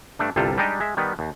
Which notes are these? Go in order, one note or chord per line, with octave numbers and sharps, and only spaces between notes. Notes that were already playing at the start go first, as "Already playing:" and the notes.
G2 A3 D4
G1 C2 C3 G3 F4 A4
G3 G#3 D4 D#4 G4 D#5
G#3 E5
D#3 G3 B3
D#2